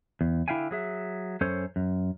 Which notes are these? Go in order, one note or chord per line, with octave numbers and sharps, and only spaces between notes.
E2
D3 E4 E5 F5 G5 G#5
F#3 G#4 E5
F#2 C#4 A4 C5 C#5
F#2